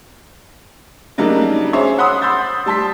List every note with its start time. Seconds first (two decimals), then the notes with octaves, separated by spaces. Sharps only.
1.18 C#3 F#3 G3 A#3 D4 D#4
1.73 C#4 G#4 C5 C#5 E5
1.98 F#5 B5 C6 D#6 E6
2.21 B5 C6 E6 G6 A6
2.66 G3 A5 C6 B6